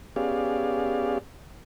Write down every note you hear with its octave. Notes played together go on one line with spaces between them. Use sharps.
B3 C#4 G4 G#4 D5 F5